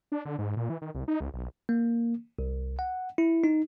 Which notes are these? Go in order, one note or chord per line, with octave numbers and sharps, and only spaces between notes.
D4
D3
G#2
A#2
E3
D#3
C2
D#4
C#2
B1
A#3
C2
F#5
E4
D#4